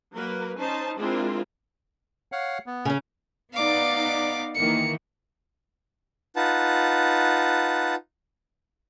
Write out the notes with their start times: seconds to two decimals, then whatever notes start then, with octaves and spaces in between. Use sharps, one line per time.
0.13 F#3 A#3 A#4 B4
0.59 C#4 D#4 C5 A5
0.97 G#3 C4 D4 E4 F4 A#4
2.32 C#5 F5 F#5
2.66 B3
2.85 C#3 C#4
3.53 B3 D#4 D5 F5 D6
4.55 D#3 E3 A#3 C#7
6.36 D#4 F4 B4 F#5 A5